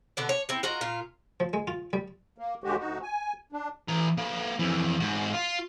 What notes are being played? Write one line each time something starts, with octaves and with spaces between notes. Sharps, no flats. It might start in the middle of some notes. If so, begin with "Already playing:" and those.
B2 D3 B3
C#5
C4 E4
F4 F#4 A#4 D#5
A#2 F4
F3
G#3
F4
G3
A#3
D#2 B2 D3 G#3 F#4 G4
D2 D#4 F#4
G#5
D4
E3 A#5
A#3 B4
F2 E3
G#2 F#4
F4